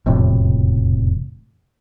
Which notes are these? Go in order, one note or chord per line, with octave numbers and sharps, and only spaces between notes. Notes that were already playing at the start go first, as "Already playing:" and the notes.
E1 F2 A2 C3